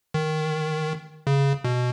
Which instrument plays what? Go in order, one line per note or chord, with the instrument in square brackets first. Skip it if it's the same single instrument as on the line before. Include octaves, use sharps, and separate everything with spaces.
[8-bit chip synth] D#3
C#3
B2